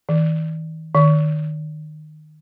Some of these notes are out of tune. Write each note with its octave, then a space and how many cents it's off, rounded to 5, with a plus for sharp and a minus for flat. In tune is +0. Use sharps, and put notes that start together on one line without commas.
D#3 +45
D#3 -20